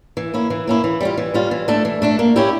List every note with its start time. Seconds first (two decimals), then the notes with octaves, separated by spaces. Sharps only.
0.17 E3
0.34 A#3 C#4 E4
0.50 E3
0.67 A#3 C#4 E4
0.84 E3
1.01 G3 C#4 F4
1.17 E3
1.34 G3 C#4 F4
1.51 E3
1.68 A3 D4 A4
1.85 E3
2.02 A3 D4 A4
2.19 A#3
2.36 C#4 E4 G4